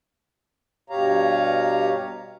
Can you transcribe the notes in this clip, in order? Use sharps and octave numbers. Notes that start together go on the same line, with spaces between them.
G2 B2 G4 C#5 F5 A#5